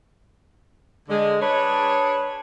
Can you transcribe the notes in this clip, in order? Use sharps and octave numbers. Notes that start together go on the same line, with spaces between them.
D3 G#3
D4 G#4 B4 C#5